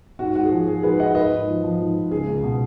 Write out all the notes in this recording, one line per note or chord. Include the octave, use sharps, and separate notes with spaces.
G#2 F#4
G#2 F#4
G#4
F3
F3 G#4
G#2 G#4 B4
G#2 D#5 F#5
G#2 B4 D#5
G#2
F3
F3
G#2
G#2
C#2 G#4
C#2
B2